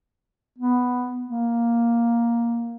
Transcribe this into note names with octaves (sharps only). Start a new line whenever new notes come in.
B3
A#3